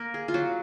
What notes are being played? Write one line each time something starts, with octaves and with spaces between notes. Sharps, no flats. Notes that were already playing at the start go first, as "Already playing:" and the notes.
Already playing: A#3 A#4
G#4
F4
F#3 F#4